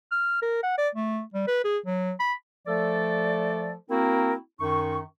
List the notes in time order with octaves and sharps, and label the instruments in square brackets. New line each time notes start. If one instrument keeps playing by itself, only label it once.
[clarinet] F6
A#4
F#5
D5
A3
G3
B4
G#4
F#3
B5
[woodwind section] F3 A3 A4 D5
A#3 C4 E4 F#4 A#4
F#2 D#3 D#4 C#6